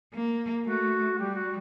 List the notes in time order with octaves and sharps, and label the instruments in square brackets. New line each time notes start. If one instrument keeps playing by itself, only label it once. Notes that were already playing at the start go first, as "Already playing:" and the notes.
[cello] A#3
[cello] A3 [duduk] F#4
[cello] G3 [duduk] G4
[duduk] F#4